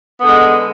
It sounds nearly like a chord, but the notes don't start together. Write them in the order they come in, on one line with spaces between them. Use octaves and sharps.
B3 D3 G#3